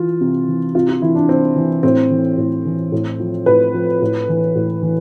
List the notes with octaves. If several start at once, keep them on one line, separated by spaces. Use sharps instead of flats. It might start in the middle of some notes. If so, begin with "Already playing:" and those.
Already playing: E3 F4
C3
E3
C3 F4
F4
E3 E4
D4
C3 C4
E3
A2 C4
E3
A2
E3
A2
F3
A2 B4
F3
A2
E3
A2
E3